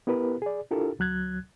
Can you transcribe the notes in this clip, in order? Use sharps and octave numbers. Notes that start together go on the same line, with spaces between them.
B3 E4 G4 A#4 B4
G#4 D5
D4 E4 F4 G4 A4 A#4
D2 F#3 F#6 G#6